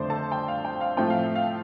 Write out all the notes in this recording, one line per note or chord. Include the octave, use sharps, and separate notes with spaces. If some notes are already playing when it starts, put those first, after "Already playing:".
Already playing: F2 D3 A3 C5 D5 C6
A4 A5
G5
F5
G5
F5
A2 F3 A3 C4 F4 G5
F5
F5